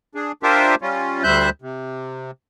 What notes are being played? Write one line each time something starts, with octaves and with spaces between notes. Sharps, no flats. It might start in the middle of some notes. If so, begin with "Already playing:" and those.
D4 G#4
D4 F4 G4 A#4 C5 E5
G3 C#4 F4
D2 G3 C5 E5 F#6 G6
C3